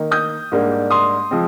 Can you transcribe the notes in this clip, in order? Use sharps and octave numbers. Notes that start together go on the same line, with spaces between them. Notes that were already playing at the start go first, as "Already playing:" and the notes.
Already playing: D#3 A#3 D#4
D#6 G6
G#2 G3 A#3 D4
C6 D#6
F3 G#3 C4